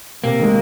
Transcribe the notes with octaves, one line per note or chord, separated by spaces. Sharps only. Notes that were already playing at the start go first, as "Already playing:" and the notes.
C3 A#3
D#3 G#3